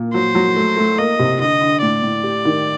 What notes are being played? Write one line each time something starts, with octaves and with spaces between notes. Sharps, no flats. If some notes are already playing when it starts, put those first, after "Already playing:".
Already playing: A#2
F#3 C5
F#3
A3
A3
A#3 D#5
C3
D3 D#5
D3
A2 D5
A2
G4
D#3